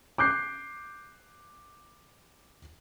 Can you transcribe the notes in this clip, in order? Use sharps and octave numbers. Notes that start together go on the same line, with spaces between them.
D6 F#6 G6 C7